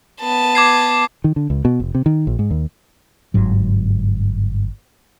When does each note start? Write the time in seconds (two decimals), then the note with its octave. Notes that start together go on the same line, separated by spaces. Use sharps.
0.21 B3 A5
0.55 D6 G#6 C7
1.24 D#3
1.36 D3
1.50 C#2
1.65 B2
1.80 F1
1.95 C3
2.06 D#3
2.27 A#1
2.39 G#2
2.51 D#2
3.34 G1 G#2 F#3